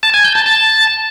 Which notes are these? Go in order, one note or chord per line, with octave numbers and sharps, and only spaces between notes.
A5
G#5
G6
A5
A5